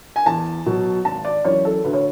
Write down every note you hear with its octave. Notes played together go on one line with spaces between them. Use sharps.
G#5
E2 A5
B2 F#3
G#1 A5
D5
F#2 E3 C#5
A4
D2 B4
C#5